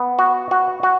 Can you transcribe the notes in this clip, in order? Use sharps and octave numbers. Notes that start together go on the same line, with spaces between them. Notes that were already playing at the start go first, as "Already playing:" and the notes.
Already playing: B3
F#4
F#4
F#4